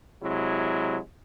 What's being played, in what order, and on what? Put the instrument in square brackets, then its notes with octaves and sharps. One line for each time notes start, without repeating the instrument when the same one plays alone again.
[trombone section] C3 F#3 G#3 E4